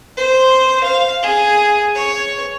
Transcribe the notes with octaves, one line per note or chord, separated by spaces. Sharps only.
C5
F5
G#4
C#5